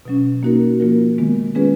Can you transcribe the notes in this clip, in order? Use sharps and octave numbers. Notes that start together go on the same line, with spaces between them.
B2 F#3 C#4
A#3 D#4 F#4 A#4
F3 A#3 F4 A#4
D#3 G#3 B3
G#3 C#4 F4 G#4 B4